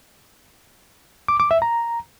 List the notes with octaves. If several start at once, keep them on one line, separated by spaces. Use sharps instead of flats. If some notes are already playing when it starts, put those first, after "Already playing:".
D6
D6
E5
A#5